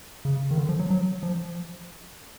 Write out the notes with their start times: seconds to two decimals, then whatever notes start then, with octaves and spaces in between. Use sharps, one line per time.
0.25 C#3
0.51 D#3
0.58 D3
0.69 F3
0.79 F#3
0.90 F#3
1.23 F3